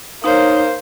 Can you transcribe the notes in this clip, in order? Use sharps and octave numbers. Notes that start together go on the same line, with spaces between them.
A#3 D#4 C5 C#5